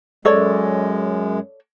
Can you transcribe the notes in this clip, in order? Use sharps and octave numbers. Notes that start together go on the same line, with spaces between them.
F#2 G#3 A4 C#5 D5